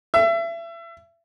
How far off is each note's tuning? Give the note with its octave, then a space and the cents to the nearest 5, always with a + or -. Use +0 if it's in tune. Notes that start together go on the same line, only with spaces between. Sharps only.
E5 +30